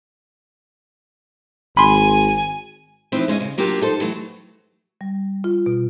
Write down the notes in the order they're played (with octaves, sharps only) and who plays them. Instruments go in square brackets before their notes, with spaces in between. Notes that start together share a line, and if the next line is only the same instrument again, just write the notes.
[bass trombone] G#1 [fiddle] G#5 [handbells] B5 C6
[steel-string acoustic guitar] E3 F3 A3 C4 D#4
G#3 C#4 C5 D#5
C#3
F#3 A#3 D4 F4 G4
D#4 A4 C5
E3 F#3 A3
[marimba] G3
F4
B2